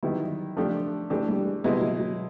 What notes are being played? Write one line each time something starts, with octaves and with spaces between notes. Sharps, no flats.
D#3 F#3 G3 B3 E4
F3 A3 D4 G4
E3 G#3 A3 D4 G4
G3
G#3
B2 G3 G#3 B3 E4
F#3
F#3